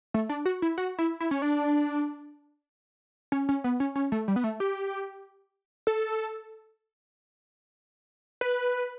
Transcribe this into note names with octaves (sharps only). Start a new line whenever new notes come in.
A3
D4
F#4
E4
F#4
E4
E4
C#4
D4
C#4
C#4
B3
C#4
C#4
A3
G3
B3
A3
G4
A4
B4